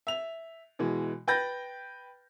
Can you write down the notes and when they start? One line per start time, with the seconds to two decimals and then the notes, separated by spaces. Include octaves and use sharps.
0.07 E5 F7
0.79 B2 E3 G#3
1.27 B4 G5 B5 G6 A6 A#6